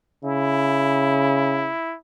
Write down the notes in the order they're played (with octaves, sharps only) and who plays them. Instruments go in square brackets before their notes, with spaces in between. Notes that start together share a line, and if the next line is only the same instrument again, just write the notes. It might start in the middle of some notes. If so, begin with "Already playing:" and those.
[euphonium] C#3 [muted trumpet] E4